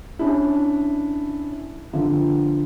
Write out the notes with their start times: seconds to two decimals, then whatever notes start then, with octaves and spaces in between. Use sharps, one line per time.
0.19 C#4 D4 E4
1.93 D3 F3